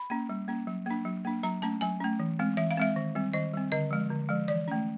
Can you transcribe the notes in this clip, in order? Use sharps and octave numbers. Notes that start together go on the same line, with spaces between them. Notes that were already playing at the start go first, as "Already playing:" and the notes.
Already playing: B5
A#3 C#4
G3
A#3 C#4
F#3
A#3 D4
F#3
A#3 D4
F#3 A#5
A3 C#4 A5
F#3 G#5
A3 C#4
E3
G#3 C4
E3 E5
F5
G#3 C4 E5
D#3
G3 C4
D#3 D#5
G3 C4
D3 D#5
F3 G#3
D3
F3 G#3
E3 D5
A3 C#4